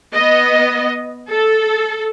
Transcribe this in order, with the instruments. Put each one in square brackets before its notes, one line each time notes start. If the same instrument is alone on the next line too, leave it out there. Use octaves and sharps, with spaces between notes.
[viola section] B3 D#5
A4